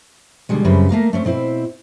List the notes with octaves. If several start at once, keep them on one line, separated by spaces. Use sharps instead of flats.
B2 D3 E3 G3 G#3
F#2 C#3 G3 C4 B4
A3 A#3 A#4 F5
A3 C4 C#4
B2 C4 E4 C5